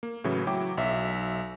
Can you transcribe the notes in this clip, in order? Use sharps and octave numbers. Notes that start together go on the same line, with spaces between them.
A#3
A2 C#3 E3 F#3
F#3 E4 G5 D6
B1 E5